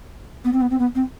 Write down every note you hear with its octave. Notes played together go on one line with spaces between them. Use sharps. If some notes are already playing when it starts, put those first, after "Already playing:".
B3
C4
B3
C4
B3
C4